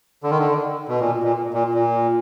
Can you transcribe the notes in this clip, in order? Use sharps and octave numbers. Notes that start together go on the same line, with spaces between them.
D3
D#3
D3
B2
A#2
A#2
A#2
A#2